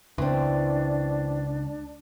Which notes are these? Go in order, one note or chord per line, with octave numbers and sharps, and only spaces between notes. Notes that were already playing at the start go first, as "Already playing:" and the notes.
C#2 E3 C4 D4